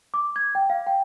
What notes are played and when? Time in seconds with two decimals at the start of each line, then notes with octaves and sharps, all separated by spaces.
0.14 D6
0.36 G#6
0.55 G5
0.70 F5
0.87 G5